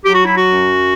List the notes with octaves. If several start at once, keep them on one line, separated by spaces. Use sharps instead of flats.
F#3 G4
F#4
E4
F#4
F#2